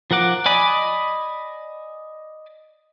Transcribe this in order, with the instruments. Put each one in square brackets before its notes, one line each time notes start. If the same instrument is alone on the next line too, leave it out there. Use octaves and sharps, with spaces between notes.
[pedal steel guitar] F3 A#4 F#5 D6
D5 D#5 G#5 B5 D6